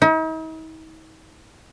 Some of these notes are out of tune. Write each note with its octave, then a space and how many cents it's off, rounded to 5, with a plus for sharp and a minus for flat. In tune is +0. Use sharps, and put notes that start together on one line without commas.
D#4 +45